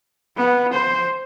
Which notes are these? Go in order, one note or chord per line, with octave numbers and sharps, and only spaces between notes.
B3
C5